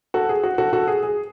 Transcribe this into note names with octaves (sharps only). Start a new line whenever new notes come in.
F#4 A4
G#4
F#4
F#4 A4
F#4 A4
G#4
G#4